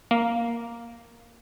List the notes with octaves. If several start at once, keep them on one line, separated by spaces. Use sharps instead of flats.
A#3